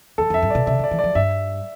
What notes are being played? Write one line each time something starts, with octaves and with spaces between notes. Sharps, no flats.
E2 A4
F2 E5
G2
B2 D5
C3 E5
D3 D5
E3
D5
F3
G2 E5